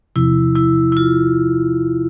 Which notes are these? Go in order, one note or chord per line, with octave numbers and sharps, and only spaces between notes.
E2 C3 F3 E4
E4
E4
F4